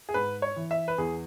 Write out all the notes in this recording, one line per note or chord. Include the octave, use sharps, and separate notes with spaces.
G#4
G#2 B4
C#5
E3
E5
B4
E2 G#4